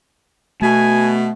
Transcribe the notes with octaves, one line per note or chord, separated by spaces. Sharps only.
B2 A3 G#5